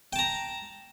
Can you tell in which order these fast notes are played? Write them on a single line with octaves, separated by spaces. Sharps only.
G5 A5 A#5